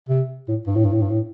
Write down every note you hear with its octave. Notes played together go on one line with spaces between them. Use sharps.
C3
A2
G2
A2
G2
A2
G2
A2